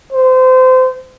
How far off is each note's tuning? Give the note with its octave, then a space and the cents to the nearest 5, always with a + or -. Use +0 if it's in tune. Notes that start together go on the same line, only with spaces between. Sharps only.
C5 -25